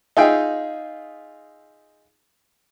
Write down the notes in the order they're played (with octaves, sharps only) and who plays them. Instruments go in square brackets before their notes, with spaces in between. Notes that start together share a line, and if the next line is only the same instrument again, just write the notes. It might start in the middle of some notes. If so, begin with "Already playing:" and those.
[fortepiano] D#4 F4 G#4 E5 G5